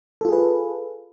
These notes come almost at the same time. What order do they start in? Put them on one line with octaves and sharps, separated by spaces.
A4 F4 G#4 B4